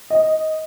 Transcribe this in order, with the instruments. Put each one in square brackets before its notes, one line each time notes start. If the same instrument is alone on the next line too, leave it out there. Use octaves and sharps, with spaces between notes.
[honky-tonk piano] D#5